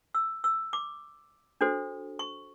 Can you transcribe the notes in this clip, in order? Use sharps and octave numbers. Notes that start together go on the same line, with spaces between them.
E6
E6
D6
D4 F#4 A4 C5
C#6